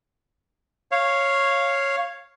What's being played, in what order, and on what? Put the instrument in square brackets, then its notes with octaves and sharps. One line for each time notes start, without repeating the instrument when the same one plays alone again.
[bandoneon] C#5 F5